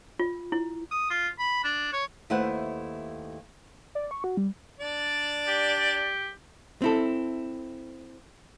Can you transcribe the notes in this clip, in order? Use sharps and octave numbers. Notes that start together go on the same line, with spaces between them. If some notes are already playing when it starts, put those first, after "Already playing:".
F4
E4
D#6
F4
B5
D4
C#5
D#2 A3 E4 B4 C5 F#5
D5
C#6
F#4
G3
D4 D5
G4
C4 E4 A4